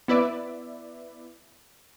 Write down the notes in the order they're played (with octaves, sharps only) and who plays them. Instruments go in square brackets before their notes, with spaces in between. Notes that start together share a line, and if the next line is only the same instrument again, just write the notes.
[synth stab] B3 E4 B4 D5 E5